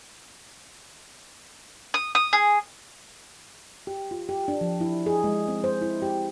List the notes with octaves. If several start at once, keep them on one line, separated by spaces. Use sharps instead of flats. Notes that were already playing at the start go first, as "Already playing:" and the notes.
D#6
D#6
G#4
G4
F4
G4
D4
F3
E4
G#4
G#3
C4
C5
E4
G4